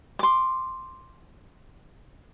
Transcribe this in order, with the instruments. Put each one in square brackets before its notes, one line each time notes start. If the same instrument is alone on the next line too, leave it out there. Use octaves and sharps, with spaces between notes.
[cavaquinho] C6 D6